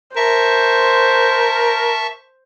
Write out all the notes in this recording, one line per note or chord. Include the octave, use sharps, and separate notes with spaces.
A#4 C5 E5 A5 C#6